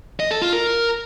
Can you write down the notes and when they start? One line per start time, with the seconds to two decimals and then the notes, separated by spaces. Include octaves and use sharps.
0.20 D#5
0.31 A4
0.42 F4
0.53 A#4